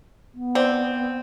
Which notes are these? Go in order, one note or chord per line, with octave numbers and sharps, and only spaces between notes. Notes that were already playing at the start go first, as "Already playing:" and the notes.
B3
C4 D5